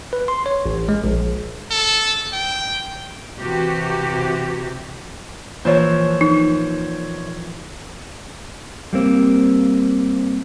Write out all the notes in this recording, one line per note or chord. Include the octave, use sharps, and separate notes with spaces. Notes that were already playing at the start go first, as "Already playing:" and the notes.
B4
C6
C#5
A1
G#3
A#1
A4
G5
C3 E3 F#4 G4
A#2 E3 F3 C5 C#5
D#4
G3 A#3 C4